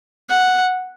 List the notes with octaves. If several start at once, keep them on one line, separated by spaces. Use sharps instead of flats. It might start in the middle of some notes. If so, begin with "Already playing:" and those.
F#5